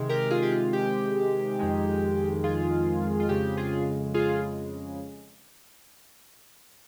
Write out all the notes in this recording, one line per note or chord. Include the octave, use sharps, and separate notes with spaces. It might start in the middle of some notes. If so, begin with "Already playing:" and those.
Already playing: C3 D#3 G#3
G4 A#4
F4 G#4
G4
F4
G4
F2 D#3 G#3
F4 G#4
F4
F2 C#3 G#3 G4
F4 G#4
F4 G#4